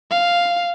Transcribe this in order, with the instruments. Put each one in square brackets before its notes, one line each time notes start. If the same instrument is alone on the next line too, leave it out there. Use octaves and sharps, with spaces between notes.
[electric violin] F5